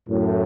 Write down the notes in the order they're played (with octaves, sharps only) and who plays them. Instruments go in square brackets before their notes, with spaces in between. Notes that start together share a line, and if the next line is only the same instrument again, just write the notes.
[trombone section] F#2 A2